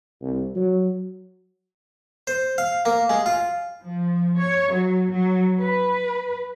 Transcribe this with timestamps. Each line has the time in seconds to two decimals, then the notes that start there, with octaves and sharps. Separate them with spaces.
0.22 C2
0.56 F#3
2.27 C5
2.58 F5
2.85 A#3
3.10 G#3
3.26 F4
3.83 F3
4.38 C#5
4.71 F#3
5.10 F#3
5.60 B4